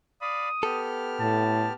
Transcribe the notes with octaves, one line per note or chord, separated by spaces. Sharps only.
D5 F5 B5 D#6
B3 G4 A4 F6
A2 A5